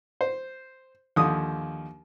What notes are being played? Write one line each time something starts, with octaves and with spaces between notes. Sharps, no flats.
C5
D#2 D3 F3 D#6